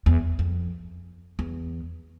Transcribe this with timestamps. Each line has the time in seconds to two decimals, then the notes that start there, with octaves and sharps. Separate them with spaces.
0.06 E2
0.39 F2
1.39 E2